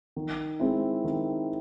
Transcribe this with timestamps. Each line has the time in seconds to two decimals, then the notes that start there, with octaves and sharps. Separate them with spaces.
0.16 D#3
0.60 G#3 C4 E4
1.04 D#3